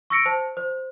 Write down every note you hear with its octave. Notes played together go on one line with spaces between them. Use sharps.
C#6 E6 A#6 C#7 D7
C5 A5
C5